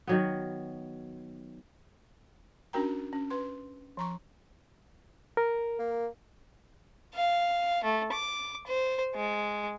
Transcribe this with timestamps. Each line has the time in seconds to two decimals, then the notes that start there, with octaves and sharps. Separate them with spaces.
0.07 D#3 F#3 B3
2.73 C#4 D4 F#4 A#4 G5 A#5
3.13 C#4
3.30 B4 C6
3.97 F3 A#5 C#6
5.37 A#4
5.79 A#3
7.15 F5
7.84 A3
8.13 D6
8.67 C5
9.15 G#3